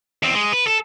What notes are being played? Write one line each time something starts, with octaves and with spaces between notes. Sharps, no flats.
E2 C4
G#3
B4
A4